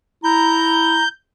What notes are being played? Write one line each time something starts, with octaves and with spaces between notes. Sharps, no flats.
E4 A#5 G6